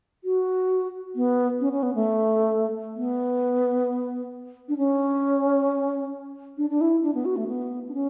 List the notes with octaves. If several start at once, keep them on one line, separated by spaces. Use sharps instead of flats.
F#4
B3
C#4
C#4
B3
A3
B3
D4
C#4
D4
D4
E4
D4
B3
F#4
A3
B3
D4
C#4